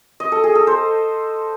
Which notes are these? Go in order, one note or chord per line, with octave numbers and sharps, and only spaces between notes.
D#5
A4
G#4
A4
C5